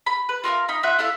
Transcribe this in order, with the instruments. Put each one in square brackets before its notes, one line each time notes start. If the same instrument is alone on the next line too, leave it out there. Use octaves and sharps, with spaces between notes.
[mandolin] B5
B4
F4 A#4 C#5 F5
D#4 B5
F4 E5 F#5 F#6
E4 A4 E5 F5